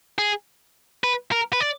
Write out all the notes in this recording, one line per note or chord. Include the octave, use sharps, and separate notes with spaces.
G#4
B4
A#4
B4
D5